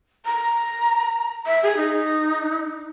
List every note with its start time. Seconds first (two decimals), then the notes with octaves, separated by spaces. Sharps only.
0.25 A#5
1.46 E5
1.63 G#4
1.77 D#4